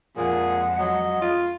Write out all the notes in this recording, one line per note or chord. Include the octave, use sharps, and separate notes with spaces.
F2 A#2 G#3 G#4 F#5
F#3 D#5
F4